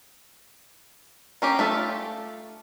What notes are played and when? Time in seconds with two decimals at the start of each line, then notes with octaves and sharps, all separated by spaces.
1.42 A#3 C#4 G4
1.59 A3 F4 A4